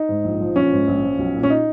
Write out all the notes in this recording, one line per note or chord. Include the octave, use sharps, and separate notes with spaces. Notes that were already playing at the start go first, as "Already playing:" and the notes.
Already playing: D#4
G#2
A#1
F3
A#1 C#4
G#2
A#1
F3
B1
A#2
C#4
D#4